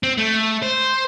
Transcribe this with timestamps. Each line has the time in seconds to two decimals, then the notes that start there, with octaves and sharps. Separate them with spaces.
0.03 C4
0.18 A3
0.63 C5